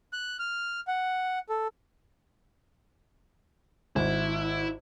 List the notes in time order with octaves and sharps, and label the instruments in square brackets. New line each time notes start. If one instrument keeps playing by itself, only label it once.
[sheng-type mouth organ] F#6
F6
F#5
A4
[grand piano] G#1 [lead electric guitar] E4